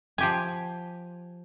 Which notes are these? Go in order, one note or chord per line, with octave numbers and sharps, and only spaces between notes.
F3 G4 G#5